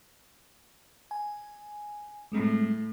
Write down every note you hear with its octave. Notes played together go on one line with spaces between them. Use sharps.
G#5
A2 G3 G#3 C4